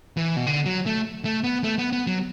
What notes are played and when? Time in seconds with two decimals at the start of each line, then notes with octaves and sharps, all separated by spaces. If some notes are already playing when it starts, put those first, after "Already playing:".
0.17 E3
0.36 B2
0.47 D3
0.66 F#3
0.86 A3
1.25 A3
1.44 B3
1.64 A3
1.79 B3
1.92 B3
2.07 F#3